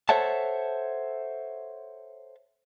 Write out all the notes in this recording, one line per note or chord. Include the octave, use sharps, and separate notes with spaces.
A4 C5 C#5 E5 F#5 A5